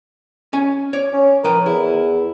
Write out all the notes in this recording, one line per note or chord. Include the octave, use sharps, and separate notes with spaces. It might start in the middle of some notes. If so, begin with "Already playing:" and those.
C#4 G#5
C#5 D5
C#4
F3 A#4 B4 G5
E2 E4